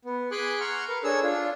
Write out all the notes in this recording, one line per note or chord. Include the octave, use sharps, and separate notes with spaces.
B3
G#4 G#5 B5 C6 D6 F#6
F#5 A#5 C6 C#6 F6
A#4 B4
D4 G#4 A4 C#5 E6
D4 F4